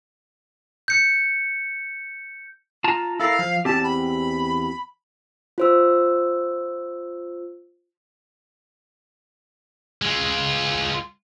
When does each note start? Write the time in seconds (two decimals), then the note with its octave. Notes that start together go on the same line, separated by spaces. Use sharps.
0.88 G6 C#7
2.84 F4 A5 A#5
3.20 E4 A4 A#4 F5
3.39 F3
3.65 E2 C4 G4 A5
3.84 B5
5.58 F4 C5 E6
10.02 G#3 F4